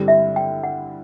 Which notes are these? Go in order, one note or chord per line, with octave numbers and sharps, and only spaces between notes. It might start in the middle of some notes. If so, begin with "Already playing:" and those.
Already playing: G2 D3 G3 C4 E4
E5
G5
F#5